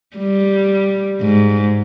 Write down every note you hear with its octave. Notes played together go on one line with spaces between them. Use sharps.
G3
G#2